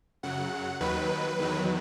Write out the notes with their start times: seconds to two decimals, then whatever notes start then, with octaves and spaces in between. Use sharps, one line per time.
0.23 F#2 C#3 F#3 F#5
0.80 D#2 D#3 F#3 B4
1.38 E2 D#3 F#3